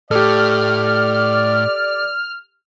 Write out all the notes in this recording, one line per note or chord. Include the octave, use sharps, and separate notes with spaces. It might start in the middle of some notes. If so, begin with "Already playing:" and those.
A2 G4 A4 D5 F6